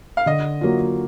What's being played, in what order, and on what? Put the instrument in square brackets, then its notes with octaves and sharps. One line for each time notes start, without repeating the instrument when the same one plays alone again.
[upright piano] F5
[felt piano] D3 [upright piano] D#5
[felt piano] F#3 A#3 F4